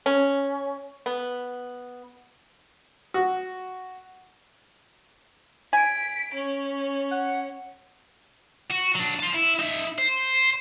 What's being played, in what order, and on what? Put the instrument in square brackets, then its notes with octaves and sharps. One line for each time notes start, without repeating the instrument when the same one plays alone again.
[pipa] C#4
B3
[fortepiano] F#4
[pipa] G#5 [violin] B6 D7
[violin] C#4
[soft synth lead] F#5
[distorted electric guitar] F#4
F#3 D4
C5 A5
E4
D#4 E5
C5